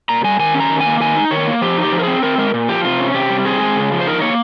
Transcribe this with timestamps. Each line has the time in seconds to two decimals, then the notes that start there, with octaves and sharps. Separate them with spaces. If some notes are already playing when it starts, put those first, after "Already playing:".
0.09 A#2 A#5
0.24 G3 G#5
0.39 D#3 G#5
0.54 C#4
0.60 A#5
0.70 D#3
0.81 G#5
0.86 A#3
1.00 D#3 G#5
1.16 D#4
1.31 D#3 C#5
1.47 A#3
1.61 F3 G4
1.78 D#4
1.83 G4
1.92 F3
1.99 A#4
2.03 C4 G#4
2.23 C4 A#4
2.38 G#3 A#4
2.54 A#2
2.69 F3 G4
2.85 C3 F4
3.00 C#4
3.14 C3 G4
3.30 G3
3.45 C4 G#4
3.61 G#3
3.77 C#3
3.92 F3
4.01 C5
4.07 D#4 A#4
4.21 A#3 C#5